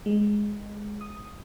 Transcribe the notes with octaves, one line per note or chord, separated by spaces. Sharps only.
G#3
D#6